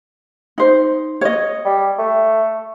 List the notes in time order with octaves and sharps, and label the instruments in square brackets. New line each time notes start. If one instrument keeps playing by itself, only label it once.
[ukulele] D#4 C5
C#5 D#5
[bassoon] G3
A3